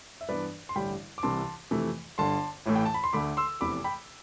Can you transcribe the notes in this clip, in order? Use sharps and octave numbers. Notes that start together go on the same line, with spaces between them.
E5
G2 E3 B3 D4 B4 D5
C6
A1 G2 D3 G3 G5 B5
D6
C2 C3 E3 A5 C6
F2 C3 E3 A3
G1 G2 D3 A5 C6
A1 A2 E3 A3
G5
A5
B5
C6
D2 D3 A3 B5 D6
C6 E6
F1 E2 C3 E3 B5 D6
G5 B5